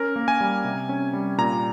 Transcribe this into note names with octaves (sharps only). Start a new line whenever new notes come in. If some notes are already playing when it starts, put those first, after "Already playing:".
Already playing: C#4 A#4
A#3
G#5
G3
C3
C#4
G3
A#2 A#5